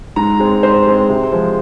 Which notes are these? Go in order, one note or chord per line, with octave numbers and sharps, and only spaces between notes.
G#2 A#5
G#3 C4
G#2 C5
G#3 C4
C3
F3 G#3